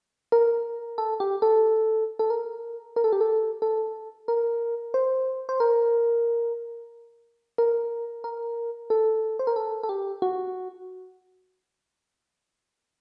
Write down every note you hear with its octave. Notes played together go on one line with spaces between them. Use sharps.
A#4
A4
G4
A4
A4
A#4
A#4
A4
G4
A4
A4
A#4
C5
C5
A#4
A#4
A#4
A4
C5
A#4
A4
A4
G4
F#4